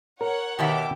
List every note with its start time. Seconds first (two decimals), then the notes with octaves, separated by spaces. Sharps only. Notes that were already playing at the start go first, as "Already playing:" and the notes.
0.21 A#4 C#5 F#5
0.59 B2 D#3 G4 E5 D6